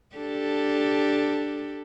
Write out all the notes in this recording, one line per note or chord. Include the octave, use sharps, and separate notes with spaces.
D4 G4 A4